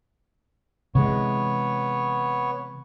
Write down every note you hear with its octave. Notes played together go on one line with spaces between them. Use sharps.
C3 E3 G#3 B3 C#5